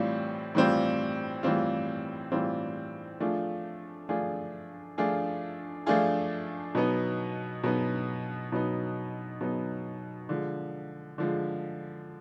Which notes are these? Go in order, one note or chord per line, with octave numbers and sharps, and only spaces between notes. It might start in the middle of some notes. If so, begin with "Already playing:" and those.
Already playing: A2 E3 G3 C4 F4
A2 E3 G3 C4 F4
A2 E3 G3 C4 F4
A2 E3 G3 C4 F4
F3 A3 D4 F4 G#4
F3 A3 D4 F4 G#4
F3 A3 D4 F4 G#4
F3 A3 D4 F4 G#4
B2 F#3 B3 D#4
B2 F#3 B3 D#4
B2 F#3 B3 D#4
B2 F#3 B3 D#4
D3 F3 G#3
D3 F3 G#3